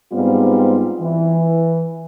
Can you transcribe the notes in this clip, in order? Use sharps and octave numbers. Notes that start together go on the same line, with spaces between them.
G#2 G3 B3 C4 F4
E3